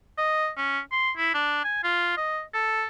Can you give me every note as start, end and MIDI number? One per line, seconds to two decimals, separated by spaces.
0.18 0.49 75
0.57 0.79 61
0.92 1.11 84
1.17 1.31 64
1.34 1.59 62
1.64 1.79 80
1.84 2.16 65
2.17 2.41 75
2.54 2.87 69